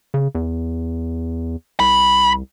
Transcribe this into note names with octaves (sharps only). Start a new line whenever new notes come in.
C#3
E2
C2 B5